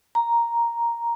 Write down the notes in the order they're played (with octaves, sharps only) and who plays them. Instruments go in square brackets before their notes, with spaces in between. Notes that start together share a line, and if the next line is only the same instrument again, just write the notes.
[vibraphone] A#5